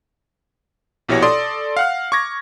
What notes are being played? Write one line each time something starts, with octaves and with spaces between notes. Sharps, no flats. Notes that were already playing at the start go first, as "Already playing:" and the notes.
A#1 B2 E4 G4 C#5 A#6
A4 D5 C6 D#6
F5 F#5 F6
C#6 D6 G#6 A#6